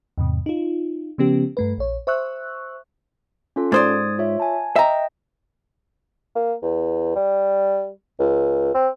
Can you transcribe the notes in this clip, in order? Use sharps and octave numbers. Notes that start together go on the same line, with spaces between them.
E2 G#2 C3
D#4 F4
C#3 F3 B3 C#4 G4
G2 A3 B4
A#1 C#5
C5 E5 C#6 E6 F#6
C#4 F4 A4
G#2 C5 D5 D#6 G#6 A6
F4 C#5 E5
G#5 A5
D#5 E5 G5 A#5
A#3
E2
G3
C#2
C4